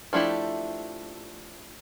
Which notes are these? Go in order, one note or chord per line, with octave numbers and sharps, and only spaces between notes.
F3 A3 D4 E4 G4